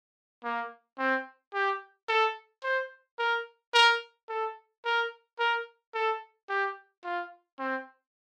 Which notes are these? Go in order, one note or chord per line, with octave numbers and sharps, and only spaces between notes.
A#3
C4
G4
A4
C5
A#4
A#4
A4
A#4
A#4
A4
G4
F4
C4